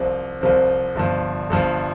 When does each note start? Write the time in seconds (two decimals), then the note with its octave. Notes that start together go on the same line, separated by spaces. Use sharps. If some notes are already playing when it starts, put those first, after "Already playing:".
Already playing: C2 C3 F3 C4
0.41 C2 C3 F3 C4
0.95 G1 G2 F3
1.50 G1 G2 F3